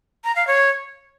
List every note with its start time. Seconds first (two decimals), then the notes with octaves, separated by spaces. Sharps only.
0.24 A#5
0.36 F5
0.47 C#5